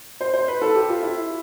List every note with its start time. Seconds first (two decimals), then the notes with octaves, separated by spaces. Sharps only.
0.21 C5
0.33 C5
0.48 B4
0.62 A4
0.75 G4
0.89 F4
1.02 E4